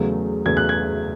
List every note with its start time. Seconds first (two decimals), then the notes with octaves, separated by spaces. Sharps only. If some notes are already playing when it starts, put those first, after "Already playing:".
Already playing: E2 C#3 F#3 A3
0.46 E2 C#3 F#3 A3 G#6
0.57 F#6
0.69 G#6